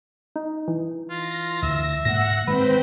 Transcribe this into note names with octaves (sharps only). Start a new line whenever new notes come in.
D#4
E3
F4 A#6
D2 E5
G#2 A#3 F#5 A#6
D#3 G#3 C4 B4 C5 B6